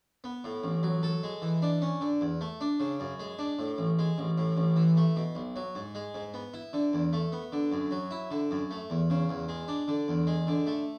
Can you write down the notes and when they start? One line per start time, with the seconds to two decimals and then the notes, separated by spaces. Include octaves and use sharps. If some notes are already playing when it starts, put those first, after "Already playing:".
0.24 B3
0.44 A2
0.64 A1
0.83 F#3
1.03 A4
1.23 G#3
1.42 E3
1.62 D4
1.82 C#4
2.01 D3
2.21 E2
2.41 A3
2.61 D4
2.80 C#3
3.00 F#2
3.20 G#3
3.39 D4
3.59 A2
3.78 A1
3.99 G#3
4.18 A1
4.38 A2
4.57 A1
4.76 E3
4.97 A3
5.16 B2
5.35 B1
5.56 F#3
5.75 G#2
5.95 G#3
6.14 G#2
6.34 B3
6.54 E4
6.73 D3
6.93 E2
7.13 A3
7.32 B3
7.52 D3
7.72 F#2
7.91 F#3
8.11 E4
8.31 D3
8.51 F#2
8.71 A3
8.90 E2
9.10 C#3
9.29 E2
9.49 G#3
9.68 D4
9.88 D3
10.08 E2
10.27 G#3
10.47 D3
10.67 A3